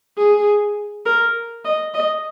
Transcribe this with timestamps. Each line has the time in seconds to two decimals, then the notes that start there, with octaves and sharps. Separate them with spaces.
0.18 G#4
1.06 A#4
1.65 D#5
1.94 D#5